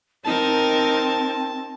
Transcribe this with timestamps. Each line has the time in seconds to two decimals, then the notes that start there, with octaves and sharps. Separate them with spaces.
0.25 C4 D#4 A#4 A5